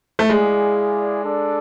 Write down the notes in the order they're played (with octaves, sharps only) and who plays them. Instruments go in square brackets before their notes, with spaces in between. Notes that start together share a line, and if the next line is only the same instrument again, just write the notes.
[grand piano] A3
[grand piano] G#3 [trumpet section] E4 G#4 D5 F5
[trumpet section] D4 A4 D5